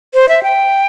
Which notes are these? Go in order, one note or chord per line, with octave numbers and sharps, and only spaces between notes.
C5
E5
G5